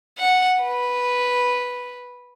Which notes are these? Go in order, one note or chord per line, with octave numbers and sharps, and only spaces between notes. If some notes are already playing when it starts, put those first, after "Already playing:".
F#5
B4